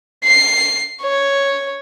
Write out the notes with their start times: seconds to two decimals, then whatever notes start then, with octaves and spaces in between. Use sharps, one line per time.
0.24 C7
1.02 C#5